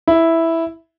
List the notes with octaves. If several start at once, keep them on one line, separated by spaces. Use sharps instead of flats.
E4